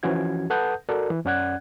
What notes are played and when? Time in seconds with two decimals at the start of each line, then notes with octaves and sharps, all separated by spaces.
0.03 E3 F3 C#4 F#4 G#6
0.50 A4 B4 F#5 A5 D#6 G6
0.89 F#4 A4 A#4 D5
1.10 E3
1.25 F#2 C#4 D5 F#5 F#6 G#6